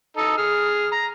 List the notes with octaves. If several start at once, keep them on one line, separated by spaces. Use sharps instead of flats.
D#4 A4
G#4 F6
A#5